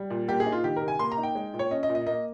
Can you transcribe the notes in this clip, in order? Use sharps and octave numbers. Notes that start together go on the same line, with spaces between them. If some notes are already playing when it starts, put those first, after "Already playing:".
Already playing: G3
A#2
A#3 G4
G#4
D#4
F4
D#3 G4
A#4
C3
G#5
A#3 C6
A#5
D#4
G5
G#3
A#2
C#5
C#4 D#5
D#5
A#2
D#5
A#3 D#5